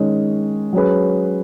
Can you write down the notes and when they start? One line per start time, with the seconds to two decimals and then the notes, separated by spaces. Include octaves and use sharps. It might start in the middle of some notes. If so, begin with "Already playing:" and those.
Already playing: D#3 G#3 C#4
0.73 F#3 C#4 G#4 B4